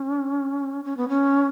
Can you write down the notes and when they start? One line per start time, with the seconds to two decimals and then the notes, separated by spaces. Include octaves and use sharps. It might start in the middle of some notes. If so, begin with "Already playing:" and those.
Already playing: C#4
0.85 C#4
0.97 B3
1.09 C#4